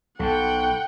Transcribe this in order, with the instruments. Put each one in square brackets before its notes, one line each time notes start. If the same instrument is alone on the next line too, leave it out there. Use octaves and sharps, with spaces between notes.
[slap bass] B1 [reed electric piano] A4 A5 [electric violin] F#5 G5